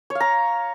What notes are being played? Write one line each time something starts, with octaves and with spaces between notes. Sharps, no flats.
C#5
F5
A#5